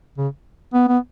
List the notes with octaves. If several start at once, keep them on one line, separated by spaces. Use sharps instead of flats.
C#3
B3
B3